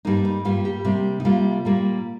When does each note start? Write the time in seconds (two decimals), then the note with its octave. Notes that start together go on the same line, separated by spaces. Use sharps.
0.05 G2 G3 A#3 D#4
0.25 D#4
0.45 G2 G3 A#3 F4
0.65 G4
0.85 C3 G3 A#3
1.20 D#4
1.25 C3 G3 A#3 F4
1.65 A#2 G3 A#3